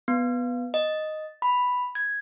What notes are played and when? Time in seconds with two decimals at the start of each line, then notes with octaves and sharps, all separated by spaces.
0.08 B3
0.74 D#5
1.42 B5
1.95 G#6